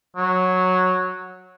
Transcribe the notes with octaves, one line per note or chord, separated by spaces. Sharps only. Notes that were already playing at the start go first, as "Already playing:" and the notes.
F#3